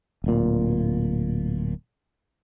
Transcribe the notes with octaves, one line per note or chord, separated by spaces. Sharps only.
D1 A#2